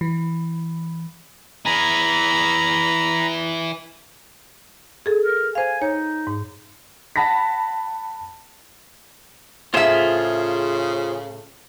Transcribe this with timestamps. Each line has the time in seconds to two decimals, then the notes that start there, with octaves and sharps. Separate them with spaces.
0.01 E3
1.66 E3 G#4 A#5 B5
5.06 G#4 A4
5.24 A#4
5.55 C5 F5 G#5
5.82 D#4 C#5
6.27 G#2
7.16 F#5 A5 B5 A#6 B6
9.74 A2 C#3 F4 G#4 C5 E5